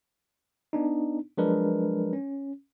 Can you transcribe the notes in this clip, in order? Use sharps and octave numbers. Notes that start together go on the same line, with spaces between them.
B3 D4 D#4
F3 F#3 G#3 D4 A#4 B4
C#4